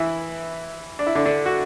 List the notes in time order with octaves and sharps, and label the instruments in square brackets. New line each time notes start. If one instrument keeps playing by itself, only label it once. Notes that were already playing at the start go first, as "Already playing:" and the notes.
Already playing: [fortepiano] E3 E4
D4
E4
D3 D4
D3 D4
F#4